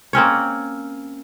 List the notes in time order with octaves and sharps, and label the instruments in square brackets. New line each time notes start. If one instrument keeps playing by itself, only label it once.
[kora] A#3 C4 C#4 C#5